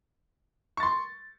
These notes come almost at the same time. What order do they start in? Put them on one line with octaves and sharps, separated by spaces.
C#6 A6 C6